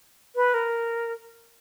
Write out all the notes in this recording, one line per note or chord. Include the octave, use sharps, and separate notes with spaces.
B4
A#4